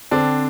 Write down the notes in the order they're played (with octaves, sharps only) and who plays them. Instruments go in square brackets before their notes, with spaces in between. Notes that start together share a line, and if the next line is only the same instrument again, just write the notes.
[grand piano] D3 D4 [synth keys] C4